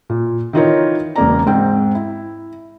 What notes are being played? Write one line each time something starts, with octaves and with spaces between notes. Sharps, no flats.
A#2
D#3 E3 D#4 F4 A#4 C#5
E1 C#3 A#3 D5 A#5
G#2 C4 G5
E4